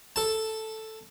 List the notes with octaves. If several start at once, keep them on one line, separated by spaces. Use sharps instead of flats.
A4 A5